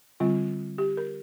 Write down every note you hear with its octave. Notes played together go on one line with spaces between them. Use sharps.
D3 G3 C4 F4
G4
A#4